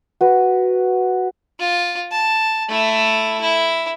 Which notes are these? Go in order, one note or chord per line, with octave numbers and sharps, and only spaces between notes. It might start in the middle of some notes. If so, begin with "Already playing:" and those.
F#4 B4
F4
A5
A3 E4
E4